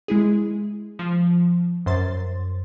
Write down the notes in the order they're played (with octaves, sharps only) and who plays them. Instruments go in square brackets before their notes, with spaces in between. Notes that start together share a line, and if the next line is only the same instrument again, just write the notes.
[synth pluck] G#3 E4 G#4
F3
F#2 C5 C6 A6